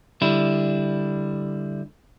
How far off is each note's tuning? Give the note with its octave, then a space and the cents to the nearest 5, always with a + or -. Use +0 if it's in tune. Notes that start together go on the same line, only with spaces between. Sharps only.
D3 +0 G3 +10 E4 +0